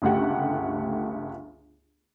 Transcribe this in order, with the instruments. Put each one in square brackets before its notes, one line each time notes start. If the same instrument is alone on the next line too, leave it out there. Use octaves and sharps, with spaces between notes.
[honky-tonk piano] G1 C#2 A3 G4 F#5